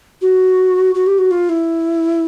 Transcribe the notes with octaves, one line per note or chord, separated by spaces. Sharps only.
F#4
F#4
G4
F#4
F4
E4